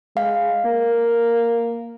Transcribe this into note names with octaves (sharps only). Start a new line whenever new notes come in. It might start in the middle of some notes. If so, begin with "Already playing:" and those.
G#3 F5
A#3